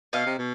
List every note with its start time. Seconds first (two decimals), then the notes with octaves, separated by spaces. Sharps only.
0.13 B2 D#5 F5
0.26 C3
0.39 B2